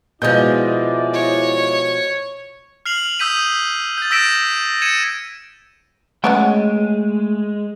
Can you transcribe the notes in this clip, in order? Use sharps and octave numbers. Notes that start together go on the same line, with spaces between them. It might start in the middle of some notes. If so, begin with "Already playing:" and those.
B2 F3 G#3 E4 D5 D#5 G6
C#5
F6 C7 F7 F#7
D#6 E6 G6 B6 D#7
G6 A6
E6 G6 A#6 B6 D7 E7
G#6 C#7 D#7 E7
G#3 A3 B3 C#4 F#4 G5